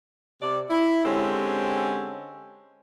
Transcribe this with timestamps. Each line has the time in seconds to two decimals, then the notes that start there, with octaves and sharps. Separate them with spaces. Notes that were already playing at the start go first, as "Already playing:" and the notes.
0.41 C3 D5
0.70 E4
1.05 D3 G#3 C4 C#4 G4 A4